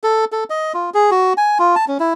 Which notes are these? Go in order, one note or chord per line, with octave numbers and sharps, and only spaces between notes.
A4
A4
D#5
F4
G#4
F#4
G#5
F4
A5
C#4
E4